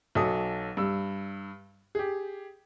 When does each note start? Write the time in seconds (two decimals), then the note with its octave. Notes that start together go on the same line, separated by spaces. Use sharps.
0.15 B1 F#3 A4 D#6
0.77 G2 E6
1.95 G4 G#4